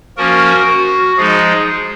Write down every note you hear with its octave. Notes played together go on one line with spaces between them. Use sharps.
F3 A#3 C#4 F#4 A#4
F#4
F3 G#3 D#4 G#4